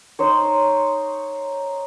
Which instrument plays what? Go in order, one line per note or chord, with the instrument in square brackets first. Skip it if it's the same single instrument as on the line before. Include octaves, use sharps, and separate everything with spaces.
[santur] D#4 C5 C#5